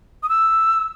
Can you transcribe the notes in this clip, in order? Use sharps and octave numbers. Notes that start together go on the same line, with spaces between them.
D#6
E6